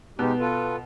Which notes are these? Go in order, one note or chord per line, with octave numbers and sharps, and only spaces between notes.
B2 G#3 D#4 G4
F4 A4 B4